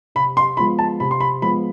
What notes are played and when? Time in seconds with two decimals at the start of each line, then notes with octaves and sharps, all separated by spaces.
0.15 C3 B5
0.37 C6
0.57 F3 G#3 B3 F4 B5
0.79 A5
1.00 C3 B5
1.11 C6
1.20 B5
1.42 F3 G#3 B3 F4 B5